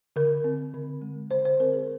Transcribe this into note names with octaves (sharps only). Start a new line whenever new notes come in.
D3 A#4
C4
D3
G#3
D3 C5
C5
C4 A#4
G#4